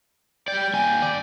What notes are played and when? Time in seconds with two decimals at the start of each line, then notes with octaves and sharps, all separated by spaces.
0.48 G3 D5 G5
0.74 D#2 G#5
1.02 G2 D5